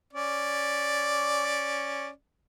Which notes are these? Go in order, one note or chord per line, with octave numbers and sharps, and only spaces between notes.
C#4 D5